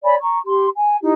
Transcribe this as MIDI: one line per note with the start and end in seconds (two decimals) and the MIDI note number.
0.03 0.15 73
0.03 0.15 74
0.03 0.15 80
0.03 0.15 83
0.20 0.37 82
0.20 0.37 85
0.44 0.66 67
0.44 0.66 84
0.75 0.96 80
1.01 1.12 63
1.01 1.12 64
1.01 1.12 67